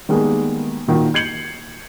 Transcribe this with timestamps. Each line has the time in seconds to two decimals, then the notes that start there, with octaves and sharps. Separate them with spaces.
0.09 D#3 G3 G#3 A#3 B3 G#4
0.87 A#2 D#3 A#3 F4 F#4
1.14 G6 G#6 C7 C#7 F#7